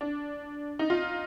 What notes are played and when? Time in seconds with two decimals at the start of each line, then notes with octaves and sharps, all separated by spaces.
0.01 D4
0.79 D#4
0.90 F4